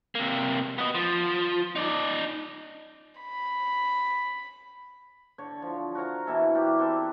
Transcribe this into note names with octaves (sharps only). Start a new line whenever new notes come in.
C3 A#3
B3 D#5
F3
D#4 D5
B5
D3 C#5
F3
F#4 A#4 C#5 A#5
B2 E3 E4 A4
G4 A#4 B4 D5
C4 A4 B4